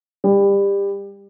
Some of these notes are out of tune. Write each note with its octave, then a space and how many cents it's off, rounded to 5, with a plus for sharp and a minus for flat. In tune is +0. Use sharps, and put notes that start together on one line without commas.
G3 +25